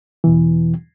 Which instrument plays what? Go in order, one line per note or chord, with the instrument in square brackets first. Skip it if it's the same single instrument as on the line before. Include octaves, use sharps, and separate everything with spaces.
[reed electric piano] E2 B2 E3